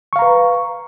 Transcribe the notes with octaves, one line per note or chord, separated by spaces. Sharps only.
B4 F5 A#5 C#6